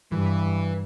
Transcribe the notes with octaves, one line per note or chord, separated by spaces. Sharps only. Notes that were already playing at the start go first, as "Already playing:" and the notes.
G2 E3